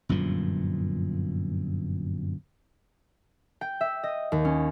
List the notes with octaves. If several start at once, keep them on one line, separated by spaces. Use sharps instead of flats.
G1 F#2 A#2 F3
G5
E5
D#5
D#2
C#4